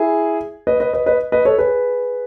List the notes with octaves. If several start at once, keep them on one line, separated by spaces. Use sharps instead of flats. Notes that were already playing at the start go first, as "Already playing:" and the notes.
Already playing: E4 G#4
B4 D#5
B4 D#5
B4 D#5
B4 D#5
B4 D#5
A4 C#5
G#4 B4